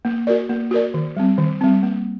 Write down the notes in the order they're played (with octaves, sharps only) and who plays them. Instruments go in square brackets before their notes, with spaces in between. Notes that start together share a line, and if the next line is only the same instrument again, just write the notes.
[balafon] A#3
F#4 A#4 D5
A#3
F#4 A#4 D5
D#3
G3 C4
D#3
G3 C4
A#3